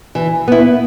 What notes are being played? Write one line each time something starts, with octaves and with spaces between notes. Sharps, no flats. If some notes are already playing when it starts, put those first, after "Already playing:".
E3
B3 E4